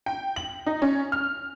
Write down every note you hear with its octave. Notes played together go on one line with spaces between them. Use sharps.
G5
F#7
D#4
C#4
F6